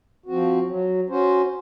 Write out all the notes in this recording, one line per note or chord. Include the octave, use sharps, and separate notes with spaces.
F3 C4 F#4
F#3
C#4 F#4 C5